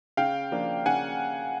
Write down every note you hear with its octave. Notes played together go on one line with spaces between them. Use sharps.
C#3 F5 G5
F3 A#3 D4
C#3 F#5 G#5